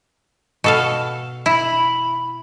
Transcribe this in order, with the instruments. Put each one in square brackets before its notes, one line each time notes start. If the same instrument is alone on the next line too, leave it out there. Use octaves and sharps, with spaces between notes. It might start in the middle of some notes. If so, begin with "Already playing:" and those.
[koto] B2 A4 F5
[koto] E4 [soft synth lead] B5